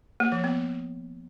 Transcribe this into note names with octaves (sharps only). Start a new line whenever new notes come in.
A#3
F3
B3